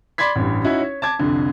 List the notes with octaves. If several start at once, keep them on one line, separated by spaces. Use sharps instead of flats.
D5 B5 C6 G#6 B6
A1 G2
C#4 D#4 E4 F#4
C#5
A5 D6 G#6
C2 F2 D3